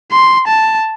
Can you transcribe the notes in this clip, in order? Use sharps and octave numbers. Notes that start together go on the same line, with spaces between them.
C6
A5